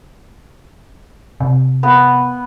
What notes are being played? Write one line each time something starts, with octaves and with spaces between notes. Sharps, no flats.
C3
B3